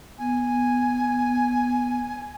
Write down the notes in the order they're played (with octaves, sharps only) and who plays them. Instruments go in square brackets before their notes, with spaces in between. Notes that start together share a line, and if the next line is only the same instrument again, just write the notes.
[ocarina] B3 [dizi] G#5